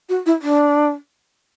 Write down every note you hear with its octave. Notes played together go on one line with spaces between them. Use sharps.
F#4
E4
D4